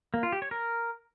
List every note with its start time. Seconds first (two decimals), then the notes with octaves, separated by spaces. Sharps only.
0.14 A#3
0.23 F4
0.32 G4
0.42 C#5
0.51 A#4